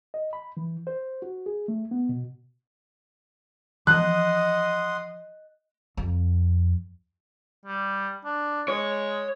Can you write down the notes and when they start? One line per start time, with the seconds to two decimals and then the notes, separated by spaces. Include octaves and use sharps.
0.14 D#5
0.33 B5
0.57 E3
0.87 C5
1.22 F#4
1.46 G#4
1.68 A3
1.91 B3
2.09 B2
3.87 E3 F3 D#5 F#5 C6 D#6 F#6
5.97 F2
7.65 G3
8.25 D4
8.68 G#3 C#5